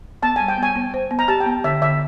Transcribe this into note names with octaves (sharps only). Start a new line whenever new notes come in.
B3 A5
G3 G#5
G5
B3 G#5
B3
C5
B3
A#5
G4 A5
G5
B3
D3 E5
D3 E5